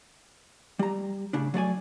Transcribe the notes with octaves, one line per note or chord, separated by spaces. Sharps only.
G3 A#5
A2 C#3 D4
F#3 A3 D5 G#5